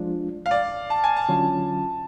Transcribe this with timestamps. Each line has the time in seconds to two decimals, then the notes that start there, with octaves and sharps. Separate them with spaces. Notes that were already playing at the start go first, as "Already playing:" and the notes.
Already playing: F3 G#3 D4 F4
0.46 F5
0.51 D5
0.90 A5
1.04 G#5
1.17 A5
1.29 D3 F#3 C#4 F4